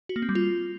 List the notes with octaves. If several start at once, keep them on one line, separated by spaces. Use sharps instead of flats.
F#4
A#3
C4
G3
F4